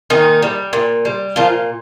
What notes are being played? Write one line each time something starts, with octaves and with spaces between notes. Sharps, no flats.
A#2 D#3 D#4
G3
A#2
G3
A#2 F3 F4